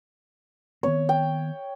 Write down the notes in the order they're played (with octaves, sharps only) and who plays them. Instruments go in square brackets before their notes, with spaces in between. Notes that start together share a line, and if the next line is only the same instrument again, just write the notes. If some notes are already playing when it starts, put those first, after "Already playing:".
[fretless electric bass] D#3 B3 C4 [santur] C#5
[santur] G5